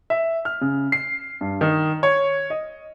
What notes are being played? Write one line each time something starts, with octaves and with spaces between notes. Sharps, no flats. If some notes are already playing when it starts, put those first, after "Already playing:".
E5
F6
C#3
C7
G2
D#3
C#5
D#5